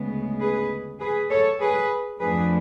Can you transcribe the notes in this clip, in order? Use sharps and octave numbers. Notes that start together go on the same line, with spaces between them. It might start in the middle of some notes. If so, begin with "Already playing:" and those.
Already playing: D2 C#3 G#3 B3
G#4 B4
G#4 B4
A4 C#5
G#4 B4
F2 F3 A3 D4 G#4 B4